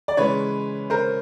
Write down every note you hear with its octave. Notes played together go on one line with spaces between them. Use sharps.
D5
C#3 E3 G#3 B4 C#5
A#4 C5